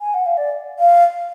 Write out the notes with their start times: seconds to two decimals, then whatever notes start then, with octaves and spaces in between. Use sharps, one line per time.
0.01 G#5
0.14 F#5
0.26 F5
0.38 D5
0.79 F5